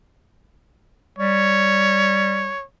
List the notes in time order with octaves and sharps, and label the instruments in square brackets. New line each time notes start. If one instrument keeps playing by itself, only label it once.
[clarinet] G3 [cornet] C#5